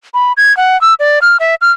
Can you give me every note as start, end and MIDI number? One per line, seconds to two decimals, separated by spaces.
0.14 0.33 83
0.37 0.55 92
0.57 0.80 78
0.81 0.94 88
1.00 1.19 74
1.22 1.37 89
1.40 1.55 76
1.61 1.72 89